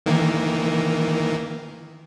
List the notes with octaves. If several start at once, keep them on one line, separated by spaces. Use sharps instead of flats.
D#3 E3 A#3